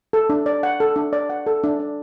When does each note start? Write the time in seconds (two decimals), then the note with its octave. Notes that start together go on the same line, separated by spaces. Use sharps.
0.13 A4
0.30 D4
0.46 D5
0.63 F#5
0.80 A4
0.96 D4
1.13 D5
1.30 F#5
1.47 A4
1.64 D4
1.79 D5